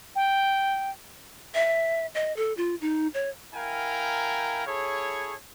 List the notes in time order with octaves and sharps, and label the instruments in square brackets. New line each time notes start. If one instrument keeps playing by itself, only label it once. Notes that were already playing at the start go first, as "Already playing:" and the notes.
[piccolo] G5
[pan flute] E5
D#5
A4
F4
D#4
C#5
[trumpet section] E4 A#4 F5 G5 G#5 A#5
E4 G#4 A4 C#5